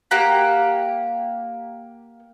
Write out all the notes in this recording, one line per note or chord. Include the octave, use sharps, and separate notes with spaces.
A#3 G4 F#5 A#5